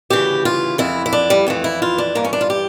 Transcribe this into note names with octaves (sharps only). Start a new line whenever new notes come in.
D2 C#3 E3 G4
F4
F2 E3 E4
E4
D4
G3
F2 E3 A3
E4
F4
D4
G2 E3 A#3
C#4
D4
F4
G4